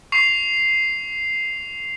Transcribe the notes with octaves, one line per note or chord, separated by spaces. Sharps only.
C#6 C7 F7